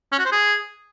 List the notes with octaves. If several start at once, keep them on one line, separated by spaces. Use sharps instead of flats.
C#4
F#4
C5
G#4